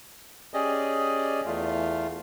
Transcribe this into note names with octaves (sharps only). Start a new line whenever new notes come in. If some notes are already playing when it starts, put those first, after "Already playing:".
C#4 G4 G#4 D5 D#5
E2 A3 F4